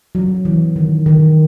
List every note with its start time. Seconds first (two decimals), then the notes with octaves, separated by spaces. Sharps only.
0.15 F#3
0.45 E3
0.76 D#3
1.06 D#3